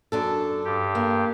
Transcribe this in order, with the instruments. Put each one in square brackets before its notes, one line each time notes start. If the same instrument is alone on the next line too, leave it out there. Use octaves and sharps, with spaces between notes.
[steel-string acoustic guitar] F#2 D4 A4
[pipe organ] G2 G4
[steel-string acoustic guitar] A#3